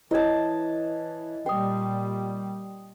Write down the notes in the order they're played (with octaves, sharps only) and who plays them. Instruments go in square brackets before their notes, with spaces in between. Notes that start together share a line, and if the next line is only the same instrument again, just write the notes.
[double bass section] E3 [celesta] E4 C#5 G#6 [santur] D#5 A5
[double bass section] A#2 G3 [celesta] G5 D#6 [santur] C6